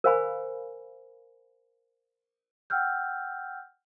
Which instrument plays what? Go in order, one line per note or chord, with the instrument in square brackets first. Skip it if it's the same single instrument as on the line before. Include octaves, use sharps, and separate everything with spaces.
[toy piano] A#4 C5 F5 G#5 B5
[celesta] F#5 G5 E6 F6 G6